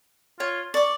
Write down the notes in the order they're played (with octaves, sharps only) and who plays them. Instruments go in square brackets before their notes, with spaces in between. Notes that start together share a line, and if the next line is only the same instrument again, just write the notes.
[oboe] F4 [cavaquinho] C#5
[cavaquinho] D5 D6 [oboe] C#6